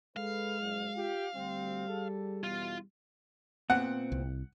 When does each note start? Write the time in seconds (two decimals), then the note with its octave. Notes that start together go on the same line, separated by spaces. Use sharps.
0.17 G#3 A4 B4 F5
0.61 F#1 F2
0.96 F4 G4
1.35 D2 G3 C4
1.89 G#4 A4
2.44 E2 B2 E3 F4
3.70 A#2 B3 C4 F#5
4.12 C2